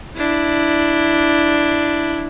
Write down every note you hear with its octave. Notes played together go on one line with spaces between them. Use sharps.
D4 E4